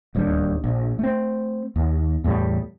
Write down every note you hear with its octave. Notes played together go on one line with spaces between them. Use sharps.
D1 D#2 G3 D4
A#1
A3 C4
D#2
E2 A2 G3